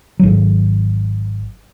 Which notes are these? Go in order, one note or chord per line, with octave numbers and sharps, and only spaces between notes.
G#1 F#3